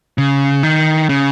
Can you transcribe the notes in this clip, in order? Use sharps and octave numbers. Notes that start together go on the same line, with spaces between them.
C#3
D#3
C#3